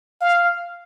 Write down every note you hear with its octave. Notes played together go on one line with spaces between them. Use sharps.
F5